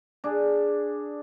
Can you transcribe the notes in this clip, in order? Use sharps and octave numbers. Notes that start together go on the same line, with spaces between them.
D4 G#4